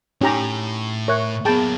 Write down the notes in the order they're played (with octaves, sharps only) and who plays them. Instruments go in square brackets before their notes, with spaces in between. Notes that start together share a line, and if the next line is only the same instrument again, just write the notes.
[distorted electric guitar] A2 [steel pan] C#4 G4 A#5 [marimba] D#4
[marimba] A#4 E5 F#6 [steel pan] C#5
[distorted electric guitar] F#3 A#3 [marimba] B3 G#4 [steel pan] G5 A5